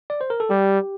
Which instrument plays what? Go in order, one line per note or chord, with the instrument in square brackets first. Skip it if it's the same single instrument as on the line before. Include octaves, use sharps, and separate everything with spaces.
[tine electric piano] D5
C5
A#4
A4
[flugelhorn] G3 [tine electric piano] G4